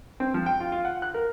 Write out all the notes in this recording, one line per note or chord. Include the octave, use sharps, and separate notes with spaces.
C4
F3
G5
F4
F4
F#5
F#6
A#4